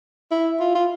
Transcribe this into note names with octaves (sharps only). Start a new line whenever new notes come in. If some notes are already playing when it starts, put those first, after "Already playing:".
E4
F4
F4